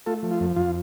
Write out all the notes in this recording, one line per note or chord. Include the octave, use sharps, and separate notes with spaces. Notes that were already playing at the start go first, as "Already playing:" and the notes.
A3 F4 A4
F3
F4
F2
F2 F4